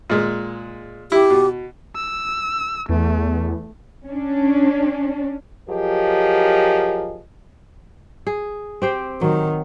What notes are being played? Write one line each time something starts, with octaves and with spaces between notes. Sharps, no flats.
A#2 G#3
E4 G4
B2
E6
E2 A3
C#4 D4
F3 F#3 G4 G#4 A#4 D#5
G#4
C4 G4 C5
D#3 F#3